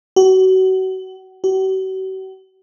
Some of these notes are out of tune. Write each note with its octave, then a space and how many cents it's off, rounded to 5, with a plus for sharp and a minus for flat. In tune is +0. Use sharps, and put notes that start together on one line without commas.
F#4 +30
F#4 +45